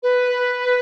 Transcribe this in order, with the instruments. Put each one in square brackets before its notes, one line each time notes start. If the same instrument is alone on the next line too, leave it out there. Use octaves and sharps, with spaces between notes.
[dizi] B4